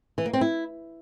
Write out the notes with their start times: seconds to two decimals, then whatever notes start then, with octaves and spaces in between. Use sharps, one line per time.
0.18 E3
0.26 A#3
0.33 C4
0.41 E4